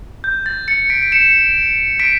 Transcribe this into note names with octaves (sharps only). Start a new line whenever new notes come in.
G6
A6
A6 C#7
B6 D7
D7
C#7 E7
B6 D7